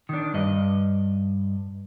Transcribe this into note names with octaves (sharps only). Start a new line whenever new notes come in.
D#3 D4
G2 D#5